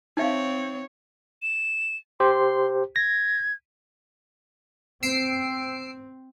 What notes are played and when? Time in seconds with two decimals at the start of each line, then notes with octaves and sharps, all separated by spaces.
0.17 C4 D#4 C#5 E5 F5
1.42 E7
2.20 G4 C5 C6
2.96 G#6 A#6
5.03 C4 E6 C7 D7